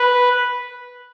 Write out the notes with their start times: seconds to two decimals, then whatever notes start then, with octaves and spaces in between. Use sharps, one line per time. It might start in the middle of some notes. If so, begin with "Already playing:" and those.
Already playing: B4